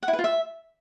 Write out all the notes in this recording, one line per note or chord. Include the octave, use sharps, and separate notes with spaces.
F#5
E4
B4
F4
E5